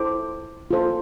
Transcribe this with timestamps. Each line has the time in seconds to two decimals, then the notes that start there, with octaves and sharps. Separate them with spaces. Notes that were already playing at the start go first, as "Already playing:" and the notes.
Already playing: E4 A4 C5 D6
0.71 F4 A4 C5